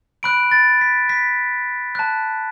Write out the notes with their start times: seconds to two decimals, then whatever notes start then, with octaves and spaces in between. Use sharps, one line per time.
0.23 B5 F#6 D7
0.51 A6
0.81 B6
1.09 B6
1.95 A5 F#6